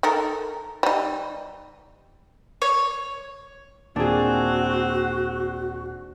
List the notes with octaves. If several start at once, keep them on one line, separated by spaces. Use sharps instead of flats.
D#4 A4 A#4
G3 D#4
C#5
D#2 A#2 C4 D4 F#4 G#4 C5